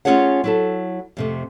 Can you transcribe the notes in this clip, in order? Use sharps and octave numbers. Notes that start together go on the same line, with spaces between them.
A3 C#4 F4 G#4 C#5 F#5
F#3 E4 A4
F2 C3 A3